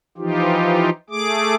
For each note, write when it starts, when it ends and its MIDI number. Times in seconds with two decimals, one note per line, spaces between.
0.18 0.90 52
0.18 0.90 53
0.18 0.90 63
0.18 0.90 65
0.18 0.90 67
1.10 1.55 57
1.10 1.55 68
1.10 1.55 86